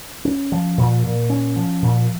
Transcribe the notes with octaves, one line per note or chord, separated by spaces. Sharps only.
C#4
F3
A#2
A#2
C#4
F3
A#2